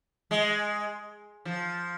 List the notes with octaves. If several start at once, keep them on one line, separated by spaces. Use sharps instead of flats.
G#3
F3